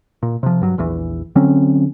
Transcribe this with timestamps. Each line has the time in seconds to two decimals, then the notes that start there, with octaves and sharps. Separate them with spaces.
0.23 A#2
0.43 C3 F3
0.61 G2 F#3
0.78 A#1 E2 E3
1.36 D3 F#3 C4 C#4